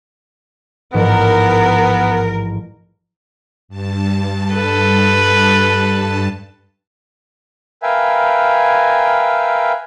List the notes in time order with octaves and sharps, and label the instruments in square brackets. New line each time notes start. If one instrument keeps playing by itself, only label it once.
[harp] A1 G#2 F3 [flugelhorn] B3 [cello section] A#4
[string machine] G2 A5
[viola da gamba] A4 B4
[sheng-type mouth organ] A#4 B4 E5 F5 G5 G#5